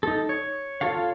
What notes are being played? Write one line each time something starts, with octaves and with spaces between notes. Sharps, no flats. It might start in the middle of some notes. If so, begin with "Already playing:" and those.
D#4 A4
C#5
F4 A4 C#5 F5